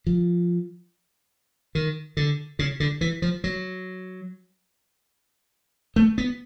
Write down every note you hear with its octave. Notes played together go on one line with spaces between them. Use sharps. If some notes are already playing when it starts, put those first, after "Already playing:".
F3
D#3
D3
C#3
D3
E3
F3
F#3
A3
B3